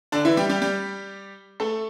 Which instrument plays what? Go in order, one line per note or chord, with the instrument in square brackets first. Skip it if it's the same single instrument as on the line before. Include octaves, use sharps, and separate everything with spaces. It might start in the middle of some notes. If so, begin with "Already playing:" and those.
[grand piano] D3 D4
E3 E4
G3 G4
G3 G4
G3 G4
A3 A4